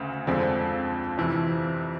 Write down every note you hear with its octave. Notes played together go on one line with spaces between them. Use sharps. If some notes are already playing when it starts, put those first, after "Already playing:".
Already playing: D2 C#3
F2 D3 F3 G#3 C4
F2 C3 E3